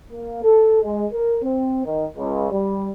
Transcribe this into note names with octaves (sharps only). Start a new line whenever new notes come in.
A#3
A4
G#3
A#4
C4
D#3
C#2
G3